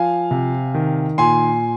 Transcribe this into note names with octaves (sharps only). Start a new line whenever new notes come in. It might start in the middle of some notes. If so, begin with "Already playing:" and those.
Already playing: F3 F5 G#5
C3
D#3
A#2 G#5 C6